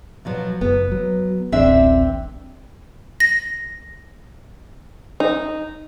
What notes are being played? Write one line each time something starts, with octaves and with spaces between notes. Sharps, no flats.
B2 F3 F#3
F#1 B3
F#3
D1 A1 C4 D4 E5
A#6
D#4